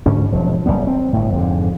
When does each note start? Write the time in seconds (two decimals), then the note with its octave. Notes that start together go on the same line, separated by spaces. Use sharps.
0.06 D2 G#2 D3 C#4
0.32 E1 F3 F#3
0.66 F#1 D#2 G3 B3
0.87 C4
1.13 G1 A2
1.34 F2 G#2 D3